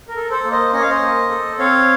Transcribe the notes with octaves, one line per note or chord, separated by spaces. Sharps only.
A#4
A4
A4 C5
A#3
C5 D#5
C#4 D#5
F5
C5 D#5
A#3
A4
C4 C#5 F5